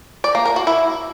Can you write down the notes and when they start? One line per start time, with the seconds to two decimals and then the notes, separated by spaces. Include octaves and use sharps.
0.24 D5
0.35 A#3
0.45 A#4
0.56 F#4
0.67 E4